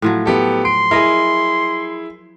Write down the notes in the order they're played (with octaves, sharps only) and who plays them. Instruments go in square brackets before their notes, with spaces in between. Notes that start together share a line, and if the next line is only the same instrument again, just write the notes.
[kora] A2 F3 F#3
[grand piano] B3 G4 A4
[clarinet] C6 [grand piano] D7
[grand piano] E4 G#4 [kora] A#4 D#5